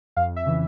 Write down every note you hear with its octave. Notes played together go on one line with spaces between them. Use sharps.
F2 F5
E5
C#3 E3